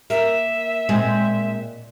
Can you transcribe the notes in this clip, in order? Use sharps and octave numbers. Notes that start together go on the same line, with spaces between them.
A#3 E5
A#2 G#3 C4